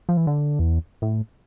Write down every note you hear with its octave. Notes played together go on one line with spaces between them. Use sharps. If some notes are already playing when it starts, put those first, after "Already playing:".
F3
E3
D3
E2
A2